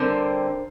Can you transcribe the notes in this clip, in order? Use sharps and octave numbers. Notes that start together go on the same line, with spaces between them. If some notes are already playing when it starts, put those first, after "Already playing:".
Already playing: D3 G3 C4 A#4 C5